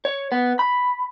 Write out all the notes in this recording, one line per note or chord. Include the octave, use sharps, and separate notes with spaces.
C#5
B3
B5